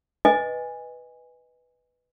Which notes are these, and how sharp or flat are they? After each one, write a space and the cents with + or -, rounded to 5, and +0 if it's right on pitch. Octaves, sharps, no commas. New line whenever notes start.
B4 +0 D#5 +0 G#5 -15